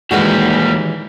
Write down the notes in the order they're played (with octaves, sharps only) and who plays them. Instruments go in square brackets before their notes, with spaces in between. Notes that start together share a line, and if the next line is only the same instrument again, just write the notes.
[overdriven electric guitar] D#2 G3 [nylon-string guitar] E3 G#3 F#4